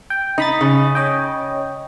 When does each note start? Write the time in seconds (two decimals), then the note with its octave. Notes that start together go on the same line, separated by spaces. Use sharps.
0.10 G5
0.38 D#4 D#5 B5 A6
0.61 C#3
0.95 C#5 D#5 G5